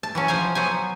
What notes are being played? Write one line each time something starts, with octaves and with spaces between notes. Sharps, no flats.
A5
E3 F#3 C#4
F3 C5 F5 G#5
F#3 B3 C5 G#5